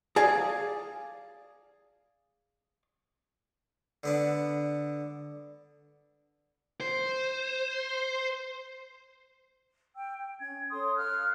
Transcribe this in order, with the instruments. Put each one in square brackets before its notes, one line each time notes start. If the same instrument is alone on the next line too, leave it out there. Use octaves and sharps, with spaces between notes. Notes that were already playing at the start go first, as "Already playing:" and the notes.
[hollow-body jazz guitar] G#4 D5 F5 [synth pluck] G#5
[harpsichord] D3 B3 D4
[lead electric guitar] C5
[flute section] G5 E6
G5
C#4 G#6
A4 C#5 C6 D#6
F5 F6 F#6